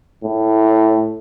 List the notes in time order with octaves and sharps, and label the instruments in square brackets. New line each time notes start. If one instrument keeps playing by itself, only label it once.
[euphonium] A2